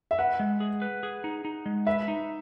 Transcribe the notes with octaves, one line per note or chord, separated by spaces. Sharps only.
E5
B4 F#5
G#3
G#4
B4
G#4
D#4
D#4
G#3
B4 E5
D#4